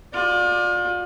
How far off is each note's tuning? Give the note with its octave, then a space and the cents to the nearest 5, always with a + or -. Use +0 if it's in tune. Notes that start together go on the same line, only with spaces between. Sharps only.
F4 +35 D5 +20